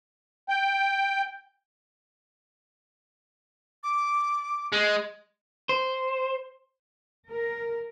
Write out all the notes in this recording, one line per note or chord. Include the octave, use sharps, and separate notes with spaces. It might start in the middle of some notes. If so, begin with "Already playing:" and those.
G5
D6
G#3
C5
A#4